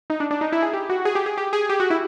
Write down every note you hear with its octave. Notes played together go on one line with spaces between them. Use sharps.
D#4
D4
D4
D#4
E4
G#4
G4
F#4
G#4
G4
G#4
G4
G#4
G4
F#4
E4